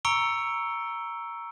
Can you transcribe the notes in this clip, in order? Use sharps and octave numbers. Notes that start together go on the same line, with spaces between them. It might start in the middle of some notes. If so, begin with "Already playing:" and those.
A#5 C#6 E6 C#7 D7 G7